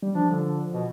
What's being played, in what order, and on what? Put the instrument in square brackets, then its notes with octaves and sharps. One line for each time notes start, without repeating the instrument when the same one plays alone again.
[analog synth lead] G3
[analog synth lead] F3 [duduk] D4
[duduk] D3
B2